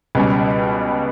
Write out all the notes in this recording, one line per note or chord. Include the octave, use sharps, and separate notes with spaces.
C#2 B2 G3 C#4